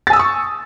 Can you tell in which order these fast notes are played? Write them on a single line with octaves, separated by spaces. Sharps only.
A6 G#5 E6 D#6 C#6